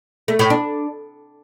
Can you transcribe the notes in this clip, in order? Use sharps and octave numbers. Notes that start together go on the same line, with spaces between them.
A3
A2
D4